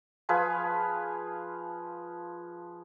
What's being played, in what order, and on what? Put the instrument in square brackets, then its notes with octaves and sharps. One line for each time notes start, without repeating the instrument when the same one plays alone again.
[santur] F3 G#4 B4 F5